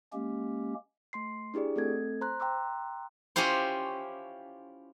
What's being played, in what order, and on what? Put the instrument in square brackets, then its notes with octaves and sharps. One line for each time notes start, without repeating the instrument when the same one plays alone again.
[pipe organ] G#3 A#3 C#4 G4
[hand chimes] A3 C6 C7
D4 E4 G4 G#4 D5
A3 C4 A4 G#6
C5 A#5 C6 F#6
G5 A#5 C6 D6 E6 F#6
[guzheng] C#4 E4 F4 G4 C5